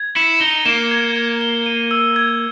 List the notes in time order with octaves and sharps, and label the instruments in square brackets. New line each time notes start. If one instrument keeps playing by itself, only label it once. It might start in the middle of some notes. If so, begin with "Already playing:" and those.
Already playing: [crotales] G#6
[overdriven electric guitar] E4 [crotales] C#7
[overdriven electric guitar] D#4 [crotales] G7
[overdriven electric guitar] A#3 [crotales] E7
[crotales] G#6
G#6
G7
D#7
E6
G#6